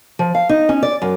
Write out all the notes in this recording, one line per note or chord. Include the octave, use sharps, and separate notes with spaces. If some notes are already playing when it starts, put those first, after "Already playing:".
F3
F5
D#4
C#4
D5
F#2